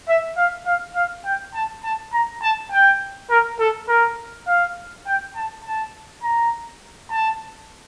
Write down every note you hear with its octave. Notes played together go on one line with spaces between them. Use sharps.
E5
F5
F5
F5
G5
A5
A5
A#5
A5
G5
A#4
A4
A#4
F5
G5
A5
A5
A#5
A5